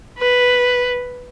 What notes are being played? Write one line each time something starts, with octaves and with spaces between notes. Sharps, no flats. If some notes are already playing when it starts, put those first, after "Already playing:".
B4